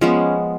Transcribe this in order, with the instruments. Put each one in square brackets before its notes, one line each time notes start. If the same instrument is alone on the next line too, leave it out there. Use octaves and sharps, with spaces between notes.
[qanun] F3 G#3 B3 C#4